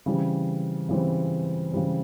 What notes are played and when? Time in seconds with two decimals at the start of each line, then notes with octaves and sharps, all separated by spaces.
0.06 C#3 E3 G3 C4
0.89 C#3 E3 G3 C4
1.72 C#3 E3 G3 C4